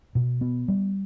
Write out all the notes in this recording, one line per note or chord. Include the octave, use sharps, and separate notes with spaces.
B2
B3
G3